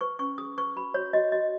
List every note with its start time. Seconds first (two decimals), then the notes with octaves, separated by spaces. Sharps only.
0.01 B4 C#6
0.19 C#4 C#6
0.38 G#4 D#6
0.57 B4 C#6
0.76 F#4 B5
0.94 F#4 C#5
1.13 F#4 D#5
1.32 F#4 D#5